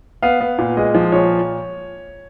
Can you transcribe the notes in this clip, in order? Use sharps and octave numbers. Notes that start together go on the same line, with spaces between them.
B3 F5
B3
A#2
G#3 D#5
F3
A#2 C#5